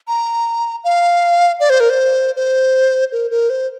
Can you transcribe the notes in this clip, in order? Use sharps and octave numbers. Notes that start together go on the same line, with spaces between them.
A#5
F5
D5
C5
A#4
C5
C5
A#4
A#4
C5